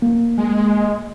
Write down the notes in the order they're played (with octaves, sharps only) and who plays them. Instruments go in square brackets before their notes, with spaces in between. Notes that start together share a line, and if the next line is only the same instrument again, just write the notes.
[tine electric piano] A#3
[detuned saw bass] G#3